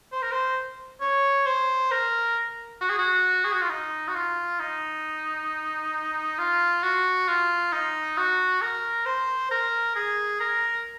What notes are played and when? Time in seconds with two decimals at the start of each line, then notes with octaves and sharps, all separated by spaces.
0.12 C5
0.22 A#4
0.32 C5
1.01 C#5
1.47 C5
1.91 A#4
2.81 F#4
2.90 G#4
2.98 F#4
3.44 G#4
3.53 F#4
3.61 F4
3.69 D#4
4.08 F#4
4.15 F4
4.60 D#4
6.38 F4
6.83 F#4
7.28 F4
7.72 D#4
8.17 F#4
8.62 A#4
9.06 C5
9.51 A#4
9.96 G#4
10.40 A#4